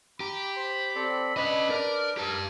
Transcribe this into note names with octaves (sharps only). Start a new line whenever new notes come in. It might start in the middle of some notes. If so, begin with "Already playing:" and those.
G4 A#5 B5
C5 C6
C4 A4 D5
C#4 D4 B4 D#5 B5 D6
A#4 D5
G4 A#4 A5